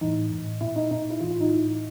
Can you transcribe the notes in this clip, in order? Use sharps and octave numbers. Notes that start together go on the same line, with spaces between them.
A2 E3 D#4
A2 E3
A#2 E4
D#4
A#2 D#4
E4
A2 E3 F4
F4
D#4
A2 E3 E4